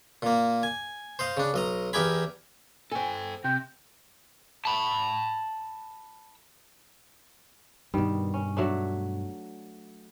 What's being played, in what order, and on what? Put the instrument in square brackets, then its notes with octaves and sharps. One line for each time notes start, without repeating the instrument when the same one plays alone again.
[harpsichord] A#2 A#3
G#5
C5 D#5 F5
C#3 D4
B1 D#5 A#5
E2 G4 A#4 D#5 G#5 B5
[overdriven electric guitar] A4 G5 [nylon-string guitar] C5 G#5
[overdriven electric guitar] C3 [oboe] G5
[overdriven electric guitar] A5 B5
[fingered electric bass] G2 B2 [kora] D#3 G3
[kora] C#4
F#3 A3 D4